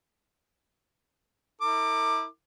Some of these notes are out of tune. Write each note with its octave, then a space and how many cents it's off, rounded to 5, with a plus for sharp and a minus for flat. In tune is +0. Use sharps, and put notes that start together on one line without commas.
E4 -40 A#4 -40 D6 +20